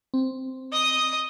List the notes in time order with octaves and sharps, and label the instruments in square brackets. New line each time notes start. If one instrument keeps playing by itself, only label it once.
[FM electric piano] C4
[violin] D#5 D#6